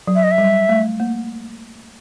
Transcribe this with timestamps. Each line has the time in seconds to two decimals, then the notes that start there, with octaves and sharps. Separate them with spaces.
0.07 F#3
0.15 E5
0.23 D#5
0.31 E5
0.38 G3
0.69 A3
1.00 A#3